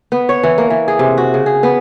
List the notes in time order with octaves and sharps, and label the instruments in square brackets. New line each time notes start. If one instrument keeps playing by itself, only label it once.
[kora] B3
C#5
E3
A#3
E3
G#4
C3
F#4
C#3
G#4
B3